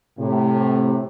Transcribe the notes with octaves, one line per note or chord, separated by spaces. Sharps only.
A2 C3